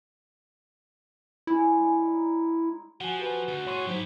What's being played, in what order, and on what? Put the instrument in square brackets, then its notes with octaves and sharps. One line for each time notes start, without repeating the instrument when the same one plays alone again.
[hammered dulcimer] D3 G#3 C#4 [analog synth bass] E4
[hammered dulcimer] D3 G#3
D#4
[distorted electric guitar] F3 [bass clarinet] F#4 [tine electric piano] F#5 G#5
[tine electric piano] G4 B4 G#5
[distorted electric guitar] D2
[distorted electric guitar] A2 G#4 [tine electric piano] C#5 C6 C#6
[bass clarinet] G#2 [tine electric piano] F#3 [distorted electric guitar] E4 G4